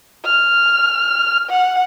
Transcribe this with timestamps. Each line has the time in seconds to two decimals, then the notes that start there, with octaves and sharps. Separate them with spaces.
0.25 F6
1.49 F#5